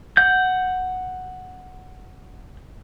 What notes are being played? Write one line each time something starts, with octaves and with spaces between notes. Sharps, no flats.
F#5 G6